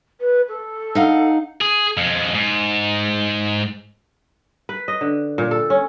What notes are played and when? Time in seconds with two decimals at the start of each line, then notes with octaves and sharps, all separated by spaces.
0.20 B4
0.48 A4
0.95 D#4 F5 F#5
1.61 G#4
1.97 F2 G#3
2.35 G#2
4.69 B4
4.88 D#5
5.01 D3
5.38 A#2
5.51 A4
5.70 C#4